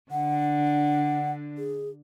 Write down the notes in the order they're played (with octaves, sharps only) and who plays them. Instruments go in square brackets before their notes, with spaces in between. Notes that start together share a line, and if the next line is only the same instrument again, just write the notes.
[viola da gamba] D3 D4 [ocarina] F#5
[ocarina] G#4